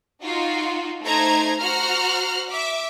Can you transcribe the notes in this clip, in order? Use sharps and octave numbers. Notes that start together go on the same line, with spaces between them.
D#4 F4 F#4
A3 D#4 C5 A#5 G#6
F#4 C5 A#5 F6 F#6
E5 D6